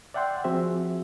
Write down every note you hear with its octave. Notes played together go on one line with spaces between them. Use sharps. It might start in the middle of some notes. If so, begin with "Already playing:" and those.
D5 E5 F#5 G5 C6
F3 C4 F#4 G#4 E5